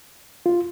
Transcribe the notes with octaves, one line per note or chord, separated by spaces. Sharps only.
F4